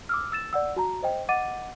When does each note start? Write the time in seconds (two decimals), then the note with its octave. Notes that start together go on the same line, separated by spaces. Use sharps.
0.09 D6 E6 F6
0.32 E6 A6 E7
0.53 D5 F#5 E6
0.76 F#4 A5 A#5
1.02 C5 D#5 G5
1.29 D#5 F#5 D6 A6 D#7